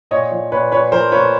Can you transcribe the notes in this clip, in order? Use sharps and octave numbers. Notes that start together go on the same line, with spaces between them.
A#2 C#5 D#5
F3
A#2 B4 C#5
A#2 B4 C#5
F3 A#4 C5
A#2 B4 C#5